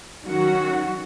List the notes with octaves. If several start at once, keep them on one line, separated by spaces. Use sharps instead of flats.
D#3 F#3 C#4 F#4